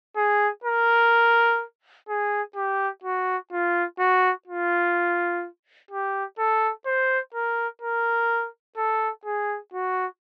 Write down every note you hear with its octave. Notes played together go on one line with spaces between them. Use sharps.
G#4
A#4
G#4
G4
F#4
F4
F#4
F4
G4
A4
C5
A#4
A#4
A4
G#4
F#4